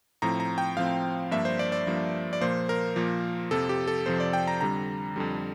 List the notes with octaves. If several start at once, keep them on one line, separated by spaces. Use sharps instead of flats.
A2 F3 C4 A#5
A#5
G5
A2 F3 C4 F5
G2 F3 A#3 D4 E5
C5
D5
D5
G2 F3 A#3 D4
D5
A#2 F3 A#3 C5
A#4
A#2 F3 A#3
F2 C3 F3 A4
G4
A4
F2 C3 F3 C5
D5
G5
A#5
F2 D3 G3 A#5
F2 D3 G3